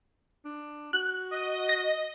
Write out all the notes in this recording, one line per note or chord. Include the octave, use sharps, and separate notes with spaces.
D4
F#4 F#6
D#5
A#6